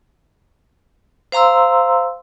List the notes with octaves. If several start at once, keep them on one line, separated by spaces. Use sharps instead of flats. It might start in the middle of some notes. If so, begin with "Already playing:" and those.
C5 F5 A#5 C6 E6